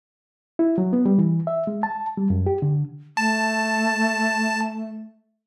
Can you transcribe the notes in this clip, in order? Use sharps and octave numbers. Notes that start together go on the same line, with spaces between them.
E4
F#3
B3
G3
E3
E5
G#3
A5
G3
F#2
G4
D3
A3 A5